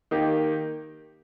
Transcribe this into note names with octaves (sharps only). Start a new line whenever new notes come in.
D#3 A#3 D#4 G4